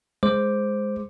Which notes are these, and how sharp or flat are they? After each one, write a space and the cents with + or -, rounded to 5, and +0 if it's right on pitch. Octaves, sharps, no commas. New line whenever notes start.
G#3 +0 C5 +0 D6 +0